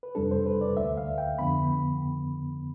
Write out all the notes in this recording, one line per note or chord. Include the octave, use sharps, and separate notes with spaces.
B4
F2 C3 G3 D4 A4
C5
B4
D5
D2 D3 A3 E5
F5
G5
F2 D3 F3 B3 B5